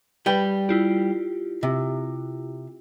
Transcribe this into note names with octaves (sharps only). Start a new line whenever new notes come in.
G3 B4 G5
E4 F4 G4
C3